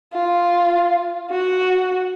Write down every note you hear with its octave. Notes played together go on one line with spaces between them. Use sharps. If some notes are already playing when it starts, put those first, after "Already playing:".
F4
F#4